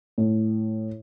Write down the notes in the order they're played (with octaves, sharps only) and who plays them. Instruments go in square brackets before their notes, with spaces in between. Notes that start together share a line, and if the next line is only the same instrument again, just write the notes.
[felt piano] A2